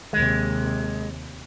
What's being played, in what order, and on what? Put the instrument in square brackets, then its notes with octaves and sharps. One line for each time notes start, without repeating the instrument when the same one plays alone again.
[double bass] D#2 C3 [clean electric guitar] G#3